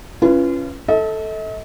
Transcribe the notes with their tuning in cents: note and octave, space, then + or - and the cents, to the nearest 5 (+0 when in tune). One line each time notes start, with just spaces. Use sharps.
C#4 +0 F4 -35 B4 +0
A4 +0 D#5 +45